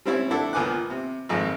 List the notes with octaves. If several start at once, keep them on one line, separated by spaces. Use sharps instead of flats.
G3 C4 C#4 E4
D4 E4 A4 F#5
C#2 A#2 B3 G#5 D6 F#6
C3
G#1 F2 G#3